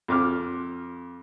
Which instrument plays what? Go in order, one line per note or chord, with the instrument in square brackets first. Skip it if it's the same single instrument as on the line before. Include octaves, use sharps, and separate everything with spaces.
[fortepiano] F2 D6 F6